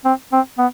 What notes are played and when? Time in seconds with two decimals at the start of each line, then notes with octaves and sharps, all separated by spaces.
0.05 C4
0.33 C4
0.58 B3